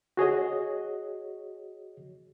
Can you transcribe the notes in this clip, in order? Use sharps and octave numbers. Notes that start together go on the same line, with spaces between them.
F#4 G#4 C#5 D#5